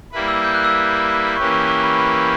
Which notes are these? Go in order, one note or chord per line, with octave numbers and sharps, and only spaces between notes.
G3 A#3 E4 B4
E6
G6
F#6
E6
E3 A#3 C#4 G4 B4 C#6
C#6
C#6
B5
B5
B5